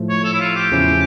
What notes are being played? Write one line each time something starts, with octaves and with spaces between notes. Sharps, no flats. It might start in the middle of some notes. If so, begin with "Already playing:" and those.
Already playing: A2 F3 A3
C#5
A4
E4
F4
G4
E2 C#3 F3 C#4 E4